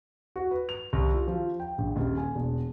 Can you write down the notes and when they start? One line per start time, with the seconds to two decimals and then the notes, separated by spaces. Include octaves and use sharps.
0.36 F#4
0.51 B4
0.69 F7
0.93 C2
1.13 F4
1.28 F3
1.60 G5
1.78 A#1
1.96 D#1
2.17 G#5
2.35 E1